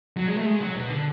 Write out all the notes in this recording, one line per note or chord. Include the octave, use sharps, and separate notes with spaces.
F#3
G#3
A3
G#3
F#3
B2
D3